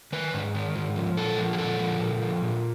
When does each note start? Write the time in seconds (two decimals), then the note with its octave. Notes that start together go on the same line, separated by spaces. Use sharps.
0.13 D#3 B4
0.34 G#2
0.55 D#3
0.75 G#2
0.96 F3
1.17 A#2 A4
1.38 F3
1.53 G#4
1.58 A#2 A4
1.80 F3
2.01 A#2
2.21 F3
2.42 A#2